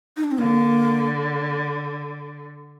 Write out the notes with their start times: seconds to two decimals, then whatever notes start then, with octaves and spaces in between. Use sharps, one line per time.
0.17 D#4
0.24 D4
0.31 C4
0.38 D3 A#3